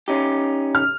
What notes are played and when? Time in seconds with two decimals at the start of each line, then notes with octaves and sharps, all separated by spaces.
0.08 C#4 D#4 G4
0.75 F6